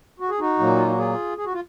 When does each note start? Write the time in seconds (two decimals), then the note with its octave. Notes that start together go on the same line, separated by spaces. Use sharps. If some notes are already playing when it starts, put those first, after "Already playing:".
0.20 F#4
0.29 G#4
0.39 D#4 F#4
0.59 A#2 F#3 A#3
0.76 F4
0.88 F#4
0.98 F4 G#4
1.37 G#4
1.46 F#4
1.53 F4